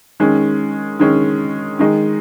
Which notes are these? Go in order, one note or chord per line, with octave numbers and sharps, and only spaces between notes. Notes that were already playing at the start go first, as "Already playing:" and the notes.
D#3 G#3 C#4
D#3 G#3 C#4
D#3 G#3 D#4